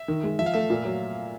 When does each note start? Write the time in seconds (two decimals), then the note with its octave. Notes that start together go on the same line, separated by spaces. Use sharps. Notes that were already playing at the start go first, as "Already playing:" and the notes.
Already playing: E5
0.08 D#3
0.24 G#3
0.39 F3 E5
0.46 F5
0.54 A3 E5
0.70 A#2
0.85 F#3